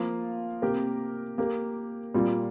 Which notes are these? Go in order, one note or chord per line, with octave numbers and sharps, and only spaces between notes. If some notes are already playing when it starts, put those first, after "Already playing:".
Already playing: F3 A#3 F4
C3 A#3 G4 A#4
A#3 G4 A#4
A#2 G3 A#3 F4